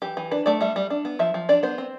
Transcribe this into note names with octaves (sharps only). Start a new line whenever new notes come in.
E3 G4
E3
D4 B4
A3 D5
G3 E5
G3
D4
B3
F3 E5
F3
D4 D5
B3 C5
C4